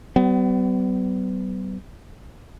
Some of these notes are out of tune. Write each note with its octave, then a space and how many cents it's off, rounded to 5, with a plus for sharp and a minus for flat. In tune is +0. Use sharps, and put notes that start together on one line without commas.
G3 -45 B3 +30